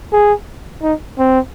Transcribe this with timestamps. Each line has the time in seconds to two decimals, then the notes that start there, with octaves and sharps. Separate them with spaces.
0.12 G#4
0.82 D#4
1.18 C4